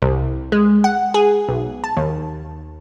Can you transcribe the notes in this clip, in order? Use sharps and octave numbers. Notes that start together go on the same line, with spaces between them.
C2
G#3
F#5
G#4
B1
A5
D#2